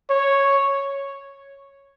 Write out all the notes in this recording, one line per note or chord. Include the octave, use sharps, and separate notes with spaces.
C#5